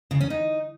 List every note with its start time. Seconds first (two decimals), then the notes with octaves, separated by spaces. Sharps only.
0.11 C#3
0.21 C#4
0.30 D#4